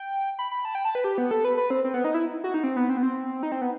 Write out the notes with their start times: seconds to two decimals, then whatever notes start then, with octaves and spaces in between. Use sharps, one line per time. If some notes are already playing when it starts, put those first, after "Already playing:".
Already playing: G5
0.39 B5
0.51 B5
0.65 A5
0.75 G5
0.85 A5
0.95 B4
1.04 G4
1.18 B3
1.31 A4
1.45 B4
1.57 B4
1.70 C4
1.84 C4
1.94 B3
2.04 D#4
2.14 E4
2.44 F#4
2.54 D#4
2.64 C4
2.76 B3
2.90 C4
2.97 B3
3.03 C4
3.43 D#4
3.52 C4
3.61 B3